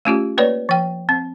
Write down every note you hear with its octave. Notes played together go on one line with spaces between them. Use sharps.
A3 C#4 F4 G4
A#3 B4 C#5 D5
F3 G5
C4